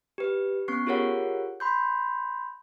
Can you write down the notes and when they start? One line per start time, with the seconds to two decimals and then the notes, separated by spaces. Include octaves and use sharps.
0.18 G4 B4
0.68 B3 C#4 C#6 C7
0.87 F4 G4 G#4 A#4 C#5 F#5
1.60 B5 C6 G6